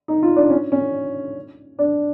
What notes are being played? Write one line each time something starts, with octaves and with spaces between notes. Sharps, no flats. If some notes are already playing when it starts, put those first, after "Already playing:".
D#4
F4
D4
C#4
C#4
D4